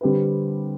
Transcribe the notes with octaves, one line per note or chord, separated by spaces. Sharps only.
D3 G3 C4 G4 B4